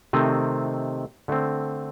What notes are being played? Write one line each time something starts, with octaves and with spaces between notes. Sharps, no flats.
C3 D#3 A3 C4 D#5
D3 A3 C4